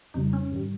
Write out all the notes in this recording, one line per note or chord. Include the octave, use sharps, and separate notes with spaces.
F2 C#3 G3 D#4
C#4
G#2 D#3 G3